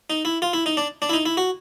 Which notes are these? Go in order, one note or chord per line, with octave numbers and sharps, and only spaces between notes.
D#4
E4
F4
E4
D#4
D4
D4
E4
D#4
E4
F#4